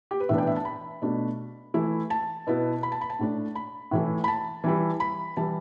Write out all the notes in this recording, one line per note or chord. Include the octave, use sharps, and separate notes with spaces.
G4
B4
A2 E3 B3 D4 E5
G5
E5
A5
B5
B2 A3 D4
E3 A3 E4
A5
B2 B3 E4
B5
A5
B5
A5
A2 A3 D4
B5
A2 E3 A3 E4
B5
A5
E3 G3 E4
B5
E3 G3 E4 A5